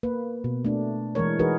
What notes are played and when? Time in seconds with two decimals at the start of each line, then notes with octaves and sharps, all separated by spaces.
0.03 A#3 B4
0.44 B2
0.65 A3 D4
1.15 E3 G#3 A#4 C#5
1.39 E3 D#4 F#4 G#4 A#4 B4